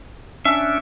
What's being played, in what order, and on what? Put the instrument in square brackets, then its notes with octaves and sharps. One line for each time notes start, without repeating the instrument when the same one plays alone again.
[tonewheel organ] C#4 D4 [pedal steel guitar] E5